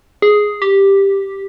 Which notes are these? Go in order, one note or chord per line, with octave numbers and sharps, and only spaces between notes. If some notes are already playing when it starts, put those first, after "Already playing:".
G#4
G4